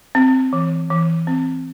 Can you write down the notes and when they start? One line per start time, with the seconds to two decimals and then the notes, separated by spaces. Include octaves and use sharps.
0.15 C4
0.53 E3
0.90 E3
1.27 C4